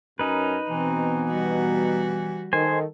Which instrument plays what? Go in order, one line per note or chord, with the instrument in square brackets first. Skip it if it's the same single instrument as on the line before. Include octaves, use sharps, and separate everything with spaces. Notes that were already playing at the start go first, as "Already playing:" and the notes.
[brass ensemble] F#2 A#4 A#5 [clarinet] C#4 [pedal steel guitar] D#4 B4
[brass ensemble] B2 [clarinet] E3 [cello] C4
[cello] G3 F#4
[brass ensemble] D#3 A4 [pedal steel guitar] C5 G#5